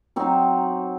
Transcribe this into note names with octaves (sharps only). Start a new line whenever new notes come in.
F#3 C4 D#4